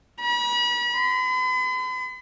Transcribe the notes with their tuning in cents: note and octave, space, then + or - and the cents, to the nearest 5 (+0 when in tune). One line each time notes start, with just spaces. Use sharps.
B5 -40
B5 +45